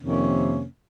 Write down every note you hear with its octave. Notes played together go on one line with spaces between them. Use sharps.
F2 C3 D#3 A#3 C#4